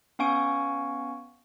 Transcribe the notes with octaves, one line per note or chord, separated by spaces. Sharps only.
B3 C#4 F5 G#5 C#6 D7